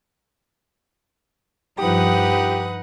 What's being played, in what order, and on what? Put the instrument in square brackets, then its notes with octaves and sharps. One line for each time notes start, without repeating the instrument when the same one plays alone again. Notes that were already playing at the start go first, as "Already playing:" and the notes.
[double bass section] G2 F3 [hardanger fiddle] D#4 F#5 [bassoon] G4 [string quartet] B4 D#6